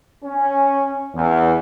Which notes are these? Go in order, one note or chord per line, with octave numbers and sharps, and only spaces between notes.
C#4
E2